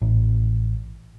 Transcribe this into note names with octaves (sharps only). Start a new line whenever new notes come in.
A1